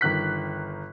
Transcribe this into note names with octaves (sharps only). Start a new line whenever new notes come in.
G1 D#3 F#6 B6